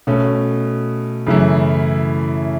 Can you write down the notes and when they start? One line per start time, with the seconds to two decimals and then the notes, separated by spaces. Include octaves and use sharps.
0.07 B2 A3 C#4
1.27 F#2 C#3 E3 A3 E4